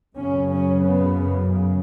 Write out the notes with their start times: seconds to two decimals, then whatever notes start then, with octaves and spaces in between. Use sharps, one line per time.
0.18 F#2 C#3 C#4
0.50 C#4
0.84 B3
1.50 C#3